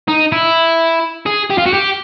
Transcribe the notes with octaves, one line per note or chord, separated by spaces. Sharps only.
D#4
E4
G#4
G4
F4
F#4
G4